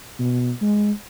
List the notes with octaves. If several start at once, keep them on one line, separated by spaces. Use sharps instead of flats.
B2
G#3